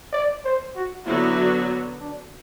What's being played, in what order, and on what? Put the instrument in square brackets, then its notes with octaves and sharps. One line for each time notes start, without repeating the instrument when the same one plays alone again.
[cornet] D5
C5
F#4
[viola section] D3 F#3 B3 F#4 [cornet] E4
[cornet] D4